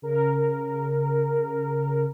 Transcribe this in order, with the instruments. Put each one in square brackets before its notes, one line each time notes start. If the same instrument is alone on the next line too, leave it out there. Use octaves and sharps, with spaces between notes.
[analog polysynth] C#3 A#4